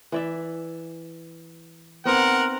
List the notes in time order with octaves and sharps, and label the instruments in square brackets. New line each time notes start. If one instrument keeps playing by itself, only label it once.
[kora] E3 D5 E5
[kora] B3 C4 D#4 [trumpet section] A#4 F#5